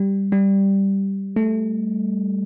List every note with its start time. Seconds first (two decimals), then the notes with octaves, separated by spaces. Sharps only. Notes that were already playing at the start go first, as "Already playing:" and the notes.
Already playing: G3
0.32 G3
1.36 A3